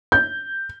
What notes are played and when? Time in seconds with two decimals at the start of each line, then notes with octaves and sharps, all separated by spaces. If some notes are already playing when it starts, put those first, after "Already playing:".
0.12 G6